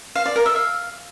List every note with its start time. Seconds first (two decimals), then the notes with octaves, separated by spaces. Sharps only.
0.15 F5
0.26 D5
0.36 A#4
0.46 E5
0.56 F5